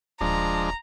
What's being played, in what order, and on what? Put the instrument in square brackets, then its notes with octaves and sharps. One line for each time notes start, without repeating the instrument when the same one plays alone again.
[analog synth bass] D#1 [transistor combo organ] F3 G#3 D4 [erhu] A#5